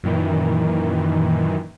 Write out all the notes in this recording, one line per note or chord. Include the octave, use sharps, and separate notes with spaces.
F#2 A#2 D#3 E3